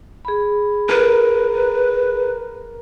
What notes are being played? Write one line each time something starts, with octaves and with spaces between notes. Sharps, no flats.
G#4 B5
A#4 B4